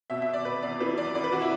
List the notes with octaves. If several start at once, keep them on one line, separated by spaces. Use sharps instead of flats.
B2 E5
E5
B2
D5
B2 B4
E2 D5
E3 B4
F#2 D5
E3 D5
B4
E3 F#4
E4